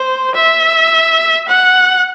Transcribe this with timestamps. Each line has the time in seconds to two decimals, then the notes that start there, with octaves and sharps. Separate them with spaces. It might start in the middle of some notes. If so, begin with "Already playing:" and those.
Already playing: C5
0.35 E5
1.48 F#5